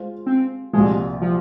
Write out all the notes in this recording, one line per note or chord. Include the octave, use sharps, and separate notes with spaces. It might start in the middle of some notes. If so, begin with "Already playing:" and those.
Already playing: G#3 F4 C5
C4
C2 A#2 F3 G#3
F3